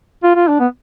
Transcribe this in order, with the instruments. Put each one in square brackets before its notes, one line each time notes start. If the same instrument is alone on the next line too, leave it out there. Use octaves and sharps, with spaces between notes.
[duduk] F4
F4
D4
B3